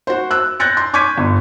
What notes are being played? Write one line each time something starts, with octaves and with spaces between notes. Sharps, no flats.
F#4 C5
E6 F#6
F#6 G6 A6 A#6 C#7
C6
C#6 D6 G6 G#6 B6 D#7
G1